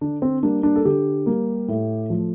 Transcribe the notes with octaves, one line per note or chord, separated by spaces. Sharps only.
D3 D4
C4
G3 A#3 D4
D4
A4
D3 G4
G3 A#3
A2
F3 A3